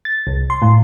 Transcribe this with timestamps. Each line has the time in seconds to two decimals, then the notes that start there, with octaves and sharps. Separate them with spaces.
0.05 A6
0.27 C2
0.50 C6
0.62 A2